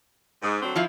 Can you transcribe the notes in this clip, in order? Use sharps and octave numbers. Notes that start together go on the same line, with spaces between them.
G#2
D3 F#3 C4
F3 E4 F4